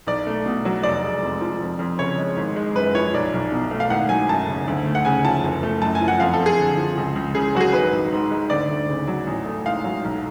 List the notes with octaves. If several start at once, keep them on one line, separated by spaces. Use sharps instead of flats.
B1 D5
A3
B2
F#3
F1 D5
G#3
F2
F3
F2
F2
C#3 C#5
G#3
G#1
G#3
F#2 B4
F3 C#5
B1 D5
B1
B2
A3
F5
G#1 F#5
F#3 G#5
F#2 A5
C#3
D2
A3
F#5
C#3 G#5
F3 A5
F#1
A3
F#2 A5
G#5
F3
F#5
F2 F5
A4
F2
G#4
D3
F3
C#2
C#2
C#3 G#4
F#3 F#4
G#4
G#1 B4
G#1
G#2
G#3
D2 D5
D2
C#3
F#3
A1
A3
G#2 F5
F#3
B1